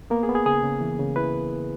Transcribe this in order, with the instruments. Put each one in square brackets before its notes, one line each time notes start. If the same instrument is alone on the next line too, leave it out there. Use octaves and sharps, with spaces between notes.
[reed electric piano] A#3 B3 A#4
G#4
B3
G#4
C#3 G#4
C#3
E3
C#3
E4 B4